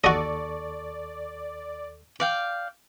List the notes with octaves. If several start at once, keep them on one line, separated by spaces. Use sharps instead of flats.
D#2 F#4 A4 D5 D#5 C#6
D5 F5 G5